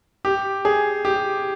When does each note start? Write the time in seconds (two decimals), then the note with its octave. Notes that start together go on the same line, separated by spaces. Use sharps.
0.25 G4
0.65 G#4
1.05 G4